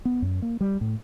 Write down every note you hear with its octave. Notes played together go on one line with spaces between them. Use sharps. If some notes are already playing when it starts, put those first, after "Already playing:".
B3
F#2
A#3
G3
A2